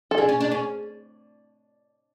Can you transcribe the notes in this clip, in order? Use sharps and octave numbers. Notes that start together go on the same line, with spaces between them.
A4
D4 G#4
C#4
D4
C#4